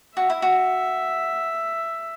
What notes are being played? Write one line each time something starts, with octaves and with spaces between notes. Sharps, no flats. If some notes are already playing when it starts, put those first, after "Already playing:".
F#4 E5
E4
F#4